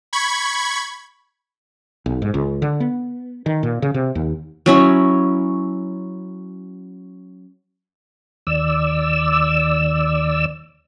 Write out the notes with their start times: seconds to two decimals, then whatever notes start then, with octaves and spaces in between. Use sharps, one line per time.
0.13 B5 C#6 G#6
2.06 B1
2.22 G#2
2.34 C#2
2.62 D3
2.80 B3
3.46 D#3
3.63 A#2
3.82 C#3
3.94 C3
4.15 D#2
4.66 F#3 C#4 E4
8.47 D#2 D5 E6